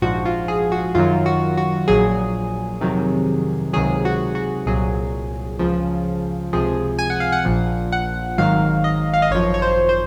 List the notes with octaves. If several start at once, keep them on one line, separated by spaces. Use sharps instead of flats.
A#1 G#2 F3 F#4
F4
G#4
F#4
F#2 D#3 F#3 F4
F#4
F#4
A#1 A#2 F#3 G#4
F2 C3 D#3 F#3
C#2 C3 D#3 F#3 G#4
F#4
F#4
C2 A#2 F#3 G#4
C#2 C#3 F3
C#2 C3 F3 G#4
G#5
F#5
F5
F#5
A#1 A#2 F3
F#5
G#1 G#2 D#3 F#3 F5
D#5
F5
D#5
G#1 F#2 F3 C#5
C#5
C5
C5